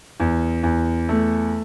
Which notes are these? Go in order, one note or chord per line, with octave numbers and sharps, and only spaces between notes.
E2
E2
A3